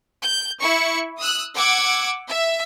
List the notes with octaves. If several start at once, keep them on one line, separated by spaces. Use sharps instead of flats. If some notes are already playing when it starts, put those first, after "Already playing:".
G6
E4 C#6 C#7
D#6 E6 F#6
F#5 D6 E6 G#6
E5